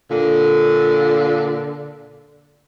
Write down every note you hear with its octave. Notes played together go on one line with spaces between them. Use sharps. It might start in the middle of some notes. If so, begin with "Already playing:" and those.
A#2 D3